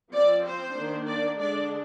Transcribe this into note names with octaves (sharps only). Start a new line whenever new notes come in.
F3 C4 D5
C5
D#3 A#3 D4
D5
D3 G#3 D4 D5